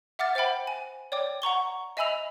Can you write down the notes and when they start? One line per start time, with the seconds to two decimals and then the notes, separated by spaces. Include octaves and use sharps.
0.19 E5 F#5 D6 F6 A6
0.35 C5 E5 F#5 G5 B5
0.67 G#5
1.12 C#5 D5 G5 D6
1.42 F#5 A#5 C#6 G7
1.97 D#5 E5 G#5 B5 E6 F7